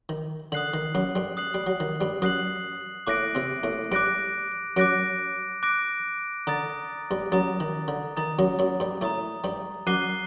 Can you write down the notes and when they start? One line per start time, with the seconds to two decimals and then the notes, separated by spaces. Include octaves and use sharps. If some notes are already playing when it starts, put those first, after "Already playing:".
0.09 D#3
0.52 D3 D#6 F#6 C7 F#7
0.74 D#3
0.95 F#2 F#3
1.15 G2 G3
1.37 D#6 F#6 C7 F#7
1.54 G3
1.67 F#3
1.80 D#3
2.01 G2 G3
2.22 F#2 F#3 D#6 F#6 C7 F#7
3.07 A2 A3 D6 F#6 A#6 D7
3.35 C3 C4
3.63 A2 A3
3.92 G2 G3 D6 F#6 A#6 D7
4.77 F#2 F#3 D6 F#6 A#6 D7
5.63 D6 F#6 A#6 D7
6.47 D3 A#5 D#6 A6
7.11 G2 G3
7.32 F#2 F#3 A#5 D#6 A6
7.60 D#3
7.88 D3
8.17 D#3 A#5 D#6 A6
8.39 F#2 F#3
8.59 F#2 F#3
8.80 G2 G3
9.01 A2 A3 A#5 D#6 A6
9.44 G2 G3
9.87 F#2 F#3 D6 F#6 C7 D#7 G7